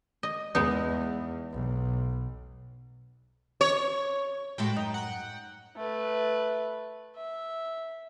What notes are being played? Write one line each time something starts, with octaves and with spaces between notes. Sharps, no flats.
D#5
E2 G#3 B3 D#4
B1
C#5
A2 G#3 F#4 G5 A5 B5
F#2 D#4 G5
F#5 G5
A3 B4
E5